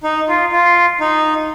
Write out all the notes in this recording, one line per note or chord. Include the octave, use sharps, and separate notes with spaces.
D#4
F4
F4
D#4